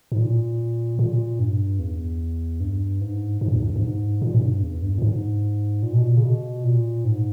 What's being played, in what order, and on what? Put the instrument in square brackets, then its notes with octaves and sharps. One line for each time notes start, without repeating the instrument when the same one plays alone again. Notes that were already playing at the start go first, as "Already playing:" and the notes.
[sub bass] G#2
A#2
A#2
G2
E2
G2
G#2
G#2
G2
E2
G2
G2
G#2
A#2
G#2
G2
E2
G2
A#2
G#2
A#2
B2
A#2
C#3
B2
A#2
G#2